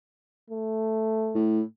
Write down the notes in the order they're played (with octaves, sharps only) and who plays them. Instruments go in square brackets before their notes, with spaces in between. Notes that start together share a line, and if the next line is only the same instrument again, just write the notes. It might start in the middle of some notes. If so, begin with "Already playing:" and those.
[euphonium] A3
[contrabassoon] A2